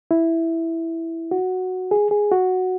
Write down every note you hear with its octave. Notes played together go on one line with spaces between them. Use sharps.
E4
F#4
G#4
G#4
F#4